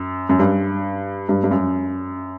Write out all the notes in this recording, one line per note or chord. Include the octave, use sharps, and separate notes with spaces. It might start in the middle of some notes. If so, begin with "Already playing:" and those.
Already playing: F#2
F#2
G2
G2
G2
F#2